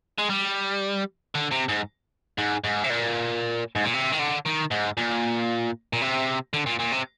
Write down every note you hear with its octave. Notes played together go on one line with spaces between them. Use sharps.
G#3
G3
D3
C3
G#2
G#2
G#2
C3
A#2
G#2
A#2
C3
D#3
D3
D#3
G#2
A#2
A#2
C3
D3
A#2
A#2
C3